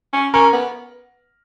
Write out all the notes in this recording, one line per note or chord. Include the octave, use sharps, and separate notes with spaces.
C#4
C#4 A#4
B3